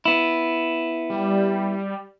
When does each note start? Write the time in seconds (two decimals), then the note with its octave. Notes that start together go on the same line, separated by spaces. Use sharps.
0.05 B3 E4
1.10 G3